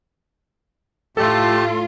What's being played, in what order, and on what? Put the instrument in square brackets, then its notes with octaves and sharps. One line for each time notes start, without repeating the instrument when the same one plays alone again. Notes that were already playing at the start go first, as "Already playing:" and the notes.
[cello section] A2 F4 [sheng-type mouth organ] A3 G4 A5 [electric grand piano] A4